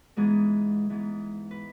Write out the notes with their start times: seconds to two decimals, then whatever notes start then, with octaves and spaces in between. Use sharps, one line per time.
0.17 G#2 E3 G#3 B3 G#4
0.89 G#2 E3 G#3 B3
1.51 B4